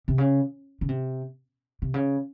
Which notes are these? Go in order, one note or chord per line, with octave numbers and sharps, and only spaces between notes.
C3
C#3
C#3
C3
C3
C#3